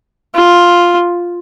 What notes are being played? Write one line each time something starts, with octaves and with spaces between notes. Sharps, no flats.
F4